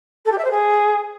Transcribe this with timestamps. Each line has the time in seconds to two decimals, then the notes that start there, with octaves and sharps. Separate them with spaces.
0.25 A4
0.31 G4
0.38 E5
0.44 C5
0.51 G#4